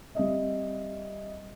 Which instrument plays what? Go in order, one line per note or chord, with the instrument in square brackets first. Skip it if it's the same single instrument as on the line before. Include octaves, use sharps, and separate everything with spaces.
[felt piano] G3 C4 D#5 E5